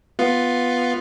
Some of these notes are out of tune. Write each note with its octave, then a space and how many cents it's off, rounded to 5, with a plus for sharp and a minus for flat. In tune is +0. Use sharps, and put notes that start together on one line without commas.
B3 +0 F4 +5